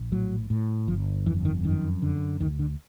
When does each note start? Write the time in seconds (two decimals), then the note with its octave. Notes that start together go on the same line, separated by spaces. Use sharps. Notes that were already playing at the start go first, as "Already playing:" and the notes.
Already playing: A#1
0.12 A2 F#3
0.50 A2
0.88 G1 F3
1.26 F2 E3
1.45 D#3
1.64 F#2 D#3
2.02 D3
2.40 D2 D#3
2.59 D3